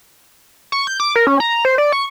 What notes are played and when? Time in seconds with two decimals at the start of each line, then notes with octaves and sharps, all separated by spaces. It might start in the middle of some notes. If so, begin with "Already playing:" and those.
0.72 C#6
0.87 G6
1.00 D6
1.16 A#4
1.27 C#4
1.40 A#5
1.65 C5
1.78 D5
1.93 C#6